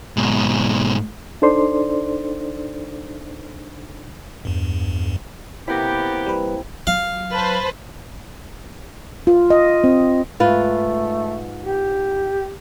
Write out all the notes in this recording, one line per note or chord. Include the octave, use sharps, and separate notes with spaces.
G#2 B2
D4 D#4 A4 C5 D5 C6
E2 G2
C3 A#3 B3 E4 G4 B5 A#6
G3 B4
F#3 F5
B4 C5 A5
F4
D#5
C4
G#2 A3 F4 B4
G4